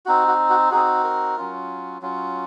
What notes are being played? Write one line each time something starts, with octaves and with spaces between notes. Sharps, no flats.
C4 D#4 F#4
F#4
F#4
C4 D#4 F#4 G#4
A#4
F#3 C#4 F4
F#3 C#4 F4